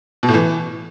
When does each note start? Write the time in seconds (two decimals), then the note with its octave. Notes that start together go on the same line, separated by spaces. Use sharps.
0.23 B2
0.29 A2
0.34 E3